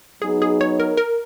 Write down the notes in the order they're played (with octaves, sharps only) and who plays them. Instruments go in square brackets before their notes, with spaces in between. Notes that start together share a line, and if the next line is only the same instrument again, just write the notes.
[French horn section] F#3 B3 D#4 [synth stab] G#4
[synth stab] G#4
C#5
A#4
A#4